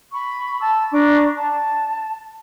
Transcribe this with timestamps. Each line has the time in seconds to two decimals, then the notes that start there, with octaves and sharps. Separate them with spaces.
0.12 B5 C#6
0.60 A5 E6
0.92 D4 A#5 C#6 D6
1.35 A5